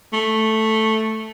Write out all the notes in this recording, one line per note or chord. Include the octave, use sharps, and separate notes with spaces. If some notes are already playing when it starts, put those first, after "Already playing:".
A3